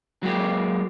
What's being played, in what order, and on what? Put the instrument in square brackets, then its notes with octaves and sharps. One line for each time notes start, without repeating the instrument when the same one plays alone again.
[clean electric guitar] F#3 G#3 A#3 G4